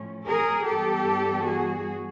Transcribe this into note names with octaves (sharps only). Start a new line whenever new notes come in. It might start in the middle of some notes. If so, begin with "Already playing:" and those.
Already playing: A2 F3 A3 C#4
G#4 A#4
G2 E3 G3 B3 G4 A4
F#4 G#4